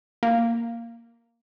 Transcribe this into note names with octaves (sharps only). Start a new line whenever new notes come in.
A#3